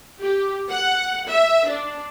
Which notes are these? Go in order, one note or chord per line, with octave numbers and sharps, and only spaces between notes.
G4
F#5
E5
D4